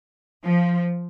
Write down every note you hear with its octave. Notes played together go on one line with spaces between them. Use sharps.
F3